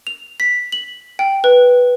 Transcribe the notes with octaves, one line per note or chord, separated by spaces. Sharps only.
F7
B6
F#7
G5
B4